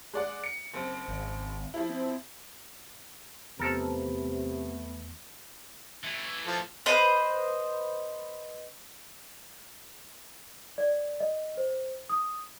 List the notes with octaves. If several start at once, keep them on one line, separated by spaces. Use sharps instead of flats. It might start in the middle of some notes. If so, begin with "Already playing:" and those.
G#3 D5 F#5
C#7
F#1 C4
G#1
F3 E4
C4
E2 C3 F3 A3 B3 A4 A#4
E3 A3
F3 A4
B4 C5 D#5
D5
D#5
C5
D#6